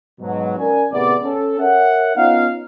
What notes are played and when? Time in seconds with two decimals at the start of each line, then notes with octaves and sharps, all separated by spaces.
0.20 G#2 B2 F#3
0.58 C#4 A#4 D5 G#5
0.91 A1 C3 B3 G#4 D5
1.24 C#4 A4
1.59 A#4 C#5 E5 F#5
2.16 B3 C#4 D#4 F4 F5